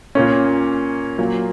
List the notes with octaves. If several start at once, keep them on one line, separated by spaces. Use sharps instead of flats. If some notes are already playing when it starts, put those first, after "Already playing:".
A#2 A#3 C#4
A#2 F#3 A#3